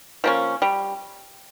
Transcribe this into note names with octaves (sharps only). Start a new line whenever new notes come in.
F3 A#3 C#4
G3